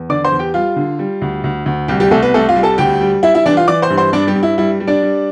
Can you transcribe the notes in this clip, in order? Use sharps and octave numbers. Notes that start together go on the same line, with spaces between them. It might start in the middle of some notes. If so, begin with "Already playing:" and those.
Already playing: E2
D3 D5 D6
C5 C6
E2
G4 G5
G3 F4 F5
D3
G3
D2
D2
D2
C2 G3 G4
G3 G4
C2 A3 A4
B3 B4
C2 A3 A4
F4 F5
G3
A4 A5
D2 G4 G5
G3
G3 E4 E5
E4 E5
E3 D4 D5
F4 F5
E3 D5 D6
C5 C6
G2
C5 C6
G2 D4 D5
G3 G4
G2
E4
G3 E4
G3
D4 D5
G3